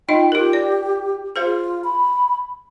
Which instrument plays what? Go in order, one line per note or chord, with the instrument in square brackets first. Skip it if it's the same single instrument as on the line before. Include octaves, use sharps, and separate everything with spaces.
[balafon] D#4 F4 D#5 [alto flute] G5
[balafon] F4 A#4 [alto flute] G4
[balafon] D5
[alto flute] F4 [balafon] G#4 C5 F5
[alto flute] B5